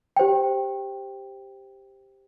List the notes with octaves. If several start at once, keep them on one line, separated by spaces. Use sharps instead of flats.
G4 C5 G5